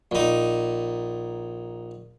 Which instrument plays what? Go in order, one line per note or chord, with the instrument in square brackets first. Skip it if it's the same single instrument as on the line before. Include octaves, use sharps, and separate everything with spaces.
[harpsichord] A#1 D#4